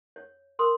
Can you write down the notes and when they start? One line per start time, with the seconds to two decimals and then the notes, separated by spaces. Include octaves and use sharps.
0.16 C#5
0.59 A#4 C6 D#6